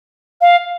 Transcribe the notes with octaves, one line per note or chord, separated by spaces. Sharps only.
F5